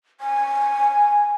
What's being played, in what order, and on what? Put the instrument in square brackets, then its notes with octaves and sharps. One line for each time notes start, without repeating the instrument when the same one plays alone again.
[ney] G#5